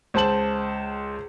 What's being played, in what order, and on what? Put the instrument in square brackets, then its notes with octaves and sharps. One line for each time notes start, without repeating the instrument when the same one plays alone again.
[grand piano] C#2 C5 A5 F#7